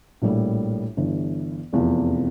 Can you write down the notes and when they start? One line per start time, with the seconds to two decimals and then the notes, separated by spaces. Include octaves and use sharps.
0.22 A#1 A2 G3 A#3 E4
0.97 G1 G2 E3
1.72 F1 E2 C3 F3